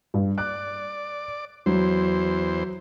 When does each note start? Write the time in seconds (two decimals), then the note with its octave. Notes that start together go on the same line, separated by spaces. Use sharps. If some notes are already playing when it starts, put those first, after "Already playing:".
0.14 G2
0.38 D5 F#6
1.66 E2 F#3 C5